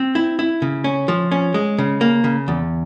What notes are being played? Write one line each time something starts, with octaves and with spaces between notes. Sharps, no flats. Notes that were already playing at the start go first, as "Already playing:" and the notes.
Already playing: C4
E4
E4
C#3
C#4
F3
C#4
G#3
C#3
A#3
C#3
E2